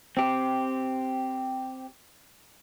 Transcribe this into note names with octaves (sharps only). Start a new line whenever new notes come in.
C4 G4